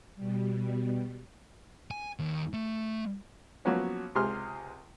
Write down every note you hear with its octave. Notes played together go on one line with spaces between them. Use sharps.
B2 G3
G#5
D#2
A3
F3 F#3 A#3 B3 C#4
C#2 C3 G#4 C6 F6